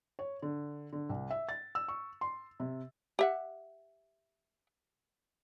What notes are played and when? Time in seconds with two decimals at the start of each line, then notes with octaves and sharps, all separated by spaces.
0.19 C#5
0.42 D3
0.92 D3
1.10 C2
1.30 E5
1.49 A6
1.75 E6
1.88 C#6
2.21 C6
2.60 C3
3.19 G4 E5 F#5